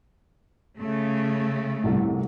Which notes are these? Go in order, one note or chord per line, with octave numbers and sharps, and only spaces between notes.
C#3 A3
G1 C2 A2